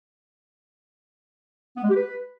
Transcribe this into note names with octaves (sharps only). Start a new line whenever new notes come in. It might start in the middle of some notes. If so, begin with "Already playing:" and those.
B3
G#3
G4
B4